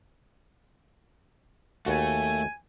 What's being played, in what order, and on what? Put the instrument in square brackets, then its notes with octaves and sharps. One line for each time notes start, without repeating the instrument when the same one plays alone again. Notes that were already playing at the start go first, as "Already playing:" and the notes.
[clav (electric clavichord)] D#2 F#4 [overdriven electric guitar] A3 [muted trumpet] G#5